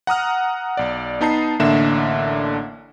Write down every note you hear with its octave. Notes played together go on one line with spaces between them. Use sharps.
F#5 A#5 D#6 F6
B1 D5
B3 D#4 A5 D#6 C7
A1 D3 A#3 D4 E5 E7